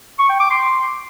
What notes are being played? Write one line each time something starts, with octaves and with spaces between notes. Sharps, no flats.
C#6
G5
D6
C6